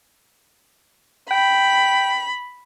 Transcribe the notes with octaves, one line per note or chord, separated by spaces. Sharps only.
G5 B5